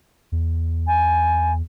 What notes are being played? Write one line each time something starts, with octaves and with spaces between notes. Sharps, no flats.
E2
G#5